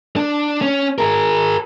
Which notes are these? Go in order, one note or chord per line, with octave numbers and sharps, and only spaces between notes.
D4
C#4
G#4 A#4